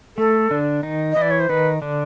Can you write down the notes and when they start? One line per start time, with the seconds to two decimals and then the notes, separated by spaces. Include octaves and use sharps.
0.17 A3 A4
0.51 D3 D4
0.83 D#3 D#4
1.12 E3 E4 D#5
1.22 D5
1.31 C#5
1.40 C5
1.49 D#3 D#4 B4
1.82 D3 D4